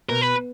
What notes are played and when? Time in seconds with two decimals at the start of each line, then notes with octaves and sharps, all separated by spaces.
0.09 B2 A#4
0.22 B4